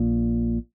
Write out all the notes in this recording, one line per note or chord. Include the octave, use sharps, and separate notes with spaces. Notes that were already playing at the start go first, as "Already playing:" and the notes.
Already playing: A#1 A#2